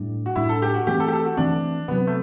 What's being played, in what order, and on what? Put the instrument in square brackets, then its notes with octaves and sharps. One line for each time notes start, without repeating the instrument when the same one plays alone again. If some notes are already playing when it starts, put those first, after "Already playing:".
Already playing: [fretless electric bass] A2 G3 D4
[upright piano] F#4
[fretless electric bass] A2 G3 D4 [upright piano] E4
[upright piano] A4
G4
F#4
[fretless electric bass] E3 A3 C4 [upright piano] G4
[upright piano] A4
G4
A4
F#4
[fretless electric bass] E3 A3 C4 [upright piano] D4
[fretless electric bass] C3 F#3 C4 [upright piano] B3
[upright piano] A3